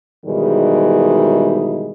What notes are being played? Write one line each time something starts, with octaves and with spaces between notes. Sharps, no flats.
G#2 B2 D#3 E3 G3 G#3